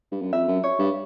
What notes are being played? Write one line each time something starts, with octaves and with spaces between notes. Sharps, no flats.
G2
F#2
F2 E5
F#2
C#5
G2